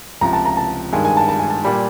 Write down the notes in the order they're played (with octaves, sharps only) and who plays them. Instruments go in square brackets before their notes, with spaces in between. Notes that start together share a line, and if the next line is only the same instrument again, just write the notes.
[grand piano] C#2 C3 F3 [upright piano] A#5
[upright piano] A5
A#5
A5
[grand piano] G2 D#3 G#3 [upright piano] G#5
[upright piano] G#5
A5
A5
G#5
A5
[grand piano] A#2 G3